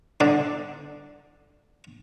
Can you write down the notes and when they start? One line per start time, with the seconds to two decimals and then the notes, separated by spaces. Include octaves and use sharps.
0.20 D3 D4